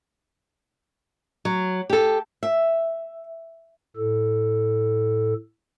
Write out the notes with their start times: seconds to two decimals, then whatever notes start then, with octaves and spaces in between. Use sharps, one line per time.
1.45 F#3
1.90 G4 A4
2.43 E5
3.96 A2 A4